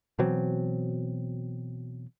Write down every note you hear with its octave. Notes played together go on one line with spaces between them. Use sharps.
B2 E3 F#3 C4